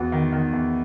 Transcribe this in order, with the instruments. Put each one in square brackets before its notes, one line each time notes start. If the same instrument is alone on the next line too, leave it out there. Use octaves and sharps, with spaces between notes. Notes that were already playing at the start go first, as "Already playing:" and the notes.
Already playing: [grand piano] E2 [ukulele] F#4
[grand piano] D#3
D#3
E2